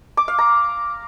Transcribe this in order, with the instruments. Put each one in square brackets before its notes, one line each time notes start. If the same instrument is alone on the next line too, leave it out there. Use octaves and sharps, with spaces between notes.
[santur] D6
F5
A#5